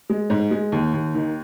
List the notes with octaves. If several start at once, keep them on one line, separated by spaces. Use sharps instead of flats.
G#3
G#2
G#3
D#2
D#2
D#3